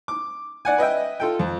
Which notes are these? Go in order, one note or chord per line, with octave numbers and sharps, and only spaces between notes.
D6
D5 F#5 G#5
B4 D#5 E5 G5
F4 A4 G5
F2